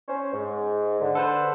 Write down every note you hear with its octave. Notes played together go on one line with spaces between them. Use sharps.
C#4 C5
G#2
D3
A4 B4 C5